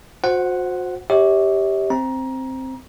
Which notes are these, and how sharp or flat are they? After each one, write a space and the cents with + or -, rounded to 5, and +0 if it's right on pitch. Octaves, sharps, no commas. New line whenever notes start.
F#4 -35 C5 +0 F#5 +0
G4 +0 C#5 +0 E5 -45
C4 +0 A#5 +20